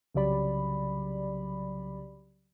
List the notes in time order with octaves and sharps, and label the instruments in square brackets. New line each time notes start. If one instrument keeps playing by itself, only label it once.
[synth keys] C2 C#3 F#3 G4 D5 B5